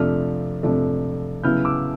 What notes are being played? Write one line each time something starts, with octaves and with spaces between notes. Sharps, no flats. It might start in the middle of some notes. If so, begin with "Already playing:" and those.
Already playing: F2 C3 F3 A3 D4 F6
F2 C3 F3 A3 D4
C#3 F#3 B3 E4 F6 G6
D6 E6